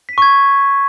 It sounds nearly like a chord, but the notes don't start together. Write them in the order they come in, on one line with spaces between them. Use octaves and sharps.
B6 D#7 C#6 G#6